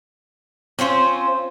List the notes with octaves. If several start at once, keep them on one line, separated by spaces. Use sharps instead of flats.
C4 C#4 F4 C5